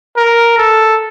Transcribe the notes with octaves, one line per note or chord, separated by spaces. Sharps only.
A#4
A4